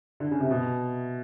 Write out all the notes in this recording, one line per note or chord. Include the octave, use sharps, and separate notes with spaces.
D3
C#3
C3
B2